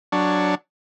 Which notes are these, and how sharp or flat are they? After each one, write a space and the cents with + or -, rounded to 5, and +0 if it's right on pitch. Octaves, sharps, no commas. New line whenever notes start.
F#3 +0 D4 +0 C#5 +5